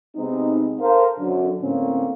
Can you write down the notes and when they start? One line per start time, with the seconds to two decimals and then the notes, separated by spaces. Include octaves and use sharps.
0.16 C3 G#3 B3 C4 D#4
0.80 A4 A#4 C5 F5
1.18 F#2 D3
1.62 A2 D3 A#3 C4 C#4